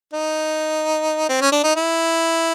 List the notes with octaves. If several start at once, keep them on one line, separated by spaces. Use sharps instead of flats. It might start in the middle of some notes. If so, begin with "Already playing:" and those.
D#4
C4
C#4
D4
D#4
E4